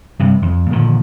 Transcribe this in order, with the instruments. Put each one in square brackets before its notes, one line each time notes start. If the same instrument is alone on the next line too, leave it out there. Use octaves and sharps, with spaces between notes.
[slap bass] G2 C3
F2
A#2 D3 D#3 F3